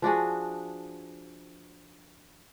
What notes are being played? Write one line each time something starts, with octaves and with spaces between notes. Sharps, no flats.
F3 D4 F#4 G#4